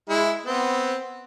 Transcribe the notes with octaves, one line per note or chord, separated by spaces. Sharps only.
G#3 E4
B3 C4